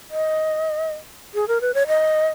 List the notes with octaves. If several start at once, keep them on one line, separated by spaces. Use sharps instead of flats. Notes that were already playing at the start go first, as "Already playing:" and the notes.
D#5
G#4
A#4
B4
C#5
D#5